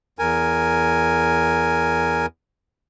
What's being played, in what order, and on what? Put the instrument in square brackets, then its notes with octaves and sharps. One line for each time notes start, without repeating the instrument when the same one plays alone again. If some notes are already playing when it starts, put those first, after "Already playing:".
[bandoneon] E2 A#4 G#5